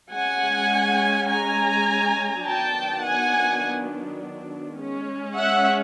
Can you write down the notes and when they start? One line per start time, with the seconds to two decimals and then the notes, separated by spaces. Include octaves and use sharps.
0.12 G#3 C#4 F#5 G#5
1.29 G#5 A#5
2.45 D#3 F#3 B3 D4 G5 A5
3.03 F#5 G#5
4.78 G#3 C#4
5.36 E5 F#5